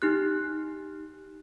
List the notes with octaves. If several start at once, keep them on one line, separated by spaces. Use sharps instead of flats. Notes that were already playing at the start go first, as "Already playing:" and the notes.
D#4 G4 F#6